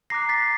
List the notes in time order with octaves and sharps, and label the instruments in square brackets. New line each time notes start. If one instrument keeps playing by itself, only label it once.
[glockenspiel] A#5 D6 F#6 A#6 C7
A6 B6